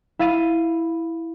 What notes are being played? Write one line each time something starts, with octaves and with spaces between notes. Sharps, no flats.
E4 F5 E6 A6 D#7